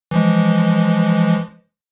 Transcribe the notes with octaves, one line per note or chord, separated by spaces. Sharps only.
E3 F3 G#3